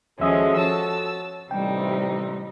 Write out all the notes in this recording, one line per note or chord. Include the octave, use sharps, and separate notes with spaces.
D#2 F3 G#3 C#4 F#4 A4 E5 D#6
C#5 A5 E6
A1 C3 G3 D#4 G5